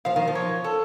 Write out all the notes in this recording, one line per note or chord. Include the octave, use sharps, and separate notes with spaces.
F3 F5
D#3
F3
C#5
A4